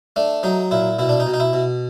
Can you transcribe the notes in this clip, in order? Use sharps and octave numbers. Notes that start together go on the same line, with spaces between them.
A3 D4
F#3 D#4
A#2 E4
B2 E4
D4
D#4
B2
D#4
E4
B2